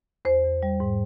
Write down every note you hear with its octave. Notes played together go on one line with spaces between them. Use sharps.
E2 C5
E2
G3
G#2